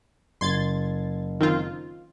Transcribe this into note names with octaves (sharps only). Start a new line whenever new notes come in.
F#1 C6 G#6 A6
D#3 C4 F4